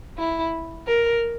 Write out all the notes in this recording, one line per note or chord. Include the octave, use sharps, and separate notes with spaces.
E4
A#4